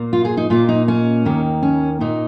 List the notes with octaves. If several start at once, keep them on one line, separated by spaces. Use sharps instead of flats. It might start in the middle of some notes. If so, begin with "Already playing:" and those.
Already playing: A#2 A#3
F4
G#4
D#4
A#2 A#3 F4
D#4
C#4
D#2 D#3 A#3
C#4
A#2 A#3 D#4